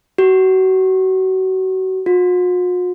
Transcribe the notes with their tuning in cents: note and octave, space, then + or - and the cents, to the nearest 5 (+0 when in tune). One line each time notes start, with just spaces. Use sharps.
F#4 +30
F#4 -45